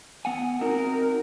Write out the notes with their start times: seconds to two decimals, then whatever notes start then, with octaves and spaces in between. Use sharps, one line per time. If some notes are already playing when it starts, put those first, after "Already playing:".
0.25 B3 F#5 G#5
0.61 C4 D#4 F#4 A#4